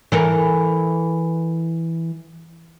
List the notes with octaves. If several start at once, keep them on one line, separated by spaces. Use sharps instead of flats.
E3 A4 A#4